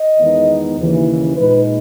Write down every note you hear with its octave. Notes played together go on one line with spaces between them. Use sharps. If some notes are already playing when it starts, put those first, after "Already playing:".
Already playing: D#5
E2 D#3 G#3 B3 D#4
D#2 C#3 E3
A#2 G#3 D#4 B4